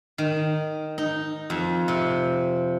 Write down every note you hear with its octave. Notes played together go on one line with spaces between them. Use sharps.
D#3
D#4
F2
C3